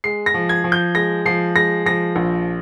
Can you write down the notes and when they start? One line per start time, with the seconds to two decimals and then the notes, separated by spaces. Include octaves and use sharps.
0.04 G#3 C7
0.26 A#6
0.34 F3
0.49 G#6
0.64 F3
0.72 G6
0.95 G#3 A#6
1.25 F3 C7
1.56 G#3 A#6
1.86 F3 A#6
2.16 A#1